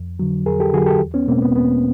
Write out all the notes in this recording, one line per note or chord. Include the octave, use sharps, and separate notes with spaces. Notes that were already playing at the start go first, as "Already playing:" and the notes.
Already playing: F2
D3 F#3
F2 G#4 A#4
G4 A4
D3 F#3 F#4 G#4
G4 A4
E2
B3 C#4
B2 G#3 A#3 C4
B3
E2 B3